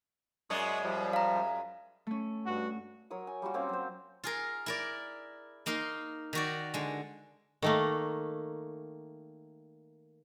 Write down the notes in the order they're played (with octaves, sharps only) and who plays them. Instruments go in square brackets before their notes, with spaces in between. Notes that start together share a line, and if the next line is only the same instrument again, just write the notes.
[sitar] F#2 G#3 D5 [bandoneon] C#6 D#6
[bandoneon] F3 G3
[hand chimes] F5 A#5
[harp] A3 C#4
[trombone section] G2 F#4
[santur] F#3 A#4 C#5 D#6
G#5
G3 A#3 F4 F#4
A#3 C4 C#4 F5
F#3 C5
[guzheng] F4 G#4 A#4
E4 A#4 D5
A#3 D#4 A#4 C6
D#3 F#4 D5
D3 G#3
[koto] D#3 A3 A#3